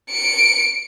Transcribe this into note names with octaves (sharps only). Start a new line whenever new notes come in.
C#7 D7